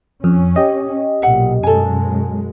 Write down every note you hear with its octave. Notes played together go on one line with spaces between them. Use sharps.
F2 C#4
G4 D#5
B1 A#2 E5 F#5
F#2 B2 G#3 A4 G#5